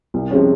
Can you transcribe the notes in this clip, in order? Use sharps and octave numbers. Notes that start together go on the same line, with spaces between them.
C2
C3 F3 G#3 C#4